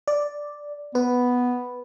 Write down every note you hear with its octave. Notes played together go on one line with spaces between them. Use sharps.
D5
B3 B4